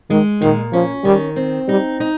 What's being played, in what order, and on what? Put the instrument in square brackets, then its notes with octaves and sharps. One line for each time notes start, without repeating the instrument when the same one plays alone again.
[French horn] D#3 [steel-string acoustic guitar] G#3
[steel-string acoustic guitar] A#2 [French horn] D#3
[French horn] F3 [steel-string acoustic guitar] C#4
[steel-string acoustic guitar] D#3 [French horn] G3
[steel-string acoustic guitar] C4
[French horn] G3 [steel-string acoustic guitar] D#4
[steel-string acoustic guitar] D#4